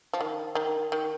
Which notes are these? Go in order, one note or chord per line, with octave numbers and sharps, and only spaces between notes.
F3
D#3
D#3
D#3